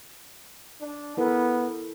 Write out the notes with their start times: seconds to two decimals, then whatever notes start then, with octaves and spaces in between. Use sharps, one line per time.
0.81 D4
1.17 B3 E4 A4 A#4